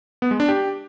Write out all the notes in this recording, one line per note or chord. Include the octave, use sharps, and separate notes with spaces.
B3
G#3
D4
G4